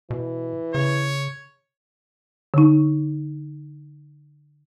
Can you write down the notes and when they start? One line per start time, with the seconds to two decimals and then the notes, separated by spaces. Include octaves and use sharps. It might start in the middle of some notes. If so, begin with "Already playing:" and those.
0.10 B2 E3
0.75 C#3 C#5
2.54 D3 D#4